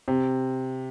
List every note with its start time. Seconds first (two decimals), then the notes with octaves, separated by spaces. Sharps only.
0.08 C3